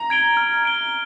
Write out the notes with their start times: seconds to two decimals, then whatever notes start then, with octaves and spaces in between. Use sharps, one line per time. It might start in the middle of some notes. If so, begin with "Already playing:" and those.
Already playing: A#5
0.10 G#6 D7 G7
0.37 F6
0.64 G#6 D7 G7